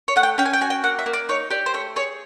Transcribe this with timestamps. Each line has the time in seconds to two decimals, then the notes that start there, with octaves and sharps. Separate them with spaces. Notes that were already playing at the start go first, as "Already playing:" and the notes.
0.08 C#5
0.16 A3 F#5
0.23 G5
0.38 C#4 G5
0.46 G#5
0.53 G5
0.61 F#4 G#5
0.70 G5
0.84 A#3 F#5
0.99 E5
1.06 A#3
1.13 D5
1.29 D#4 C#5
1.50 G4 D5
1.66 C5
1.74 A3 C#5
1.96 G#4 C#5